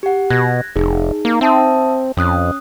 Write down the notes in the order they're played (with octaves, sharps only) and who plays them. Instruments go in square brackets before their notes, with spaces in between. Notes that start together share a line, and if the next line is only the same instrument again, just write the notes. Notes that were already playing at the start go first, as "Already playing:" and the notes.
[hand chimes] G4 F#5
[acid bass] B2 [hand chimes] F#6 G#6 A#6
[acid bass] F1 [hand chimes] D#4 G#4
[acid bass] A#3 [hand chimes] D#4
[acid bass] C4 [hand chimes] E5 A5 D#6
[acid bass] F2 [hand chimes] C#4 D#6 F#6